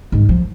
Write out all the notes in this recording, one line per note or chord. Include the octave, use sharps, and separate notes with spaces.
G#2
F3